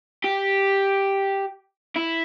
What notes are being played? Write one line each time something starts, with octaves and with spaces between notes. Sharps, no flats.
G4
E4